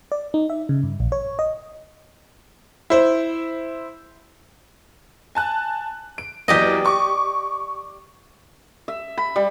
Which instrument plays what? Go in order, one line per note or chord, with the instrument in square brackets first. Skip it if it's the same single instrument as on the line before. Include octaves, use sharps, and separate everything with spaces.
[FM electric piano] D5
D#4
E5
C#3
G2
A#1
C#5
D#5
[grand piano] E4 C5
[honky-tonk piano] G#5 A5 F#6
D7
[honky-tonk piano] E2 F#3 A#3 [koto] G4 D5 D#5
[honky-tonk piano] C#6 D6
[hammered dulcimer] E5
B5
G3